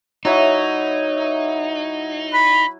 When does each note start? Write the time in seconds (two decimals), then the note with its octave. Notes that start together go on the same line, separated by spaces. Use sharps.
0.25 F#3 D#4 E4
2.34 B5